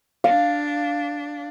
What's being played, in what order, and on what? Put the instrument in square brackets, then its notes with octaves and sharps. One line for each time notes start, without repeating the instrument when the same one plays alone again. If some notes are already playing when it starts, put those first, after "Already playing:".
[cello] D4 [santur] F5